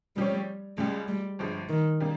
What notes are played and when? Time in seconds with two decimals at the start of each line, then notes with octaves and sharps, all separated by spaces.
0.16 C#3 F3 G3 C4 G4 C#5
0.77 C#2 C#3 G3 G#3
1.08 G3
1.39 G1 G2 F3 G#3
1.69 D#3
2.00 C#3 G3 A#3